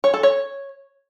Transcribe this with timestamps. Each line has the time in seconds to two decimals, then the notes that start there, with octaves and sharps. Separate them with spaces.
0.04 C#5
0.14 A4
0.23 C#5